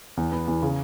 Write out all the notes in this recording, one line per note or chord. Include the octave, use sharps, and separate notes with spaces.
E2
B3
E2
C#3